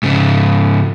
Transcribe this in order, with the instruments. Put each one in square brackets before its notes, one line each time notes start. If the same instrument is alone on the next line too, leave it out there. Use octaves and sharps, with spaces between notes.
[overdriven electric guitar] G#2 C#3